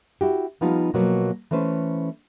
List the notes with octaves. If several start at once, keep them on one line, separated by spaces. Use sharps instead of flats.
E4 F#4 G4
F3 G3 B3 D#4 F4
B2 F3 F#3 A#3 B3
E3 A3 C#4 B4 C5